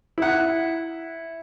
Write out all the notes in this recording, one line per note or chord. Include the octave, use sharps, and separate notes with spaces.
E4 F#5